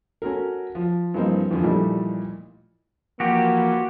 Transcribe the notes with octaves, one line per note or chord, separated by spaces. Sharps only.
C#4 F#4 A4 A#4
F3
G2 E3 F3 A#3 C4 D#4
E2 D3 F3
A#2 E3 F3 G3 A3 D#4
E3 F3 A#3 F#4 G4